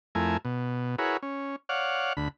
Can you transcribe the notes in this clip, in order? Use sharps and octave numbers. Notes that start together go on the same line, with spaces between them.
F2 A3 E4 A#4 G#5
B2
E4 F#4 G#4 A#4 B4 C#5
C#4
C#5 D5 F5 F#5
D2 B5